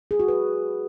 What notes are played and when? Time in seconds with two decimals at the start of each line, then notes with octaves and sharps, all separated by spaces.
0.11 G#4
0.20 F#4
0.28 B4